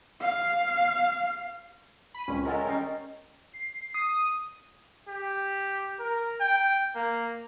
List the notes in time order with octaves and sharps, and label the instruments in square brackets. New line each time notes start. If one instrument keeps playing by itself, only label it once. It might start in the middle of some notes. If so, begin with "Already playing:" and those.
[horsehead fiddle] F5
[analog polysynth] B5 D#7
[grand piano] C#2 C#5 [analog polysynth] C4 C#4
[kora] D#3 G#3 A4 [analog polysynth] C#4 A#4 [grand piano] E4 F#5
[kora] G3 D#4 [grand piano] G5 G6 C7
[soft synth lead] C7
D#6
[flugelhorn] G4
A#4
G5
A#3